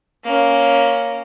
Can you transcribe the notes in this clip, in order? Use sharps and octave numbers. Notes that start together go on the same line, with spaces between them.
A#3 C#4